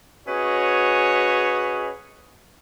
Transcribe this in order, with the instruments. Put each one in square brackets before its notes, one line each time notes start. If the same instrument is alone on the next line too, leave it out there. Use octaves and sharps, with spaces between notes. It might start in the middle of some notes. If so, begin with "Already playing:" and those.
[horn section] C#4 F#4 G#4 B4 C#5 D#5